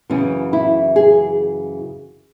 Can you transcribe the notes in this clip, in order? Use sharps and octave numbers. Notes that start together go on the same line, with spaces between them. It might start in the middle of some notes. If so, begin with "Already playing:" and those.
F#2 C#3 E3 C#4
E4
G#4